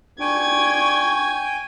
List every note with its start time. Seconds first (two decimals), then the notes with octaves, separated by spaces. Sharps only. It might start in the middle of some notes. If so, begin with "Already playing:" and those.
0.20 D4 G5 G#5 C#6 G#6